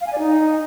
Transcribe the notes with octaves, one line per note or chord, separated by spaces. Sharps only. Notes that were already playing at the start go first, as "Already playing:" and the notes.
F5
G#5
D5
D#4